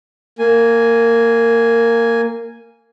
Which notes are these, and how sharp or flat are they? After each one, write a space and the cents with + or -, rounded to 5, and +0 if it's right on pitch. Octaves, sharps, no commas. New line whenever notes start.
A#3 -15 G#5 +0